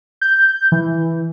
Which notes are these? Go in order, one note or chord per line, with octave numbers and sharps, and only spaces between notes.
G6
E3